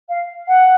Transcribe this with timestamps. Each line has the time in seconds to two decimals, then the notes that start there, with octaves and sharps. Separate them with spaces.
0.09 F5
0.47 F#5